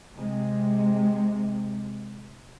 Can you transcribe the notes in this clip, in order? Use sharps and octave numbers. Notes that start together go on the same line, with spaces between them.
C3 G#3